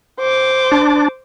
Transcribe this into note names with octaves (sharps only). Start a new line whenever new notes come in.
C5 D6
D4